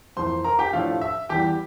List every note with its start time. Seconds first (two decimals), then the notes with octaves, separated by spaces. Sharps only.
0.17 F2 E3 A#3 C5 C6
0.44 A#4 A#5
0.59 G4 G5
0.73 A2 F3 A3 D4 F4 F5
1.01 E5
1.29 E2 E3 G3 G4 G5